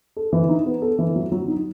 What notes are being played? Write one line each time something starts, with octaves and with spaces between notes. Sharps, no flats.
A4
E3
D#4
B3
A4
E3
F#3
F#3
D#4